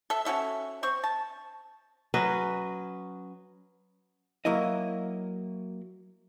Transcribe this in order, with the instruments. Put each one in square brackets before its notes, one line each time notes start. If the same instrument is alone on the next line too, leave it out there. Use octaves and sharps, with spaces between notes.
[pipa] A4 E5
C#4 F#4 A4 E5
C4 C#6
A5
[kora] F#3 C#4 B4 D#5
[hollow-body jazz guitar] F#3 A#3 E4 D#5